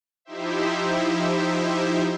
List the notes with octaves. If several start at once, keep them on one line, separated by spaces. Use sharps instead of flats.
F3 D#4 E4 G4 C5 E5